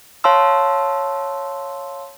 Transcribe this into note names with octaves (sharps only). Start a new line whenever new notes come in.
C#5 F5 A5 C6 E6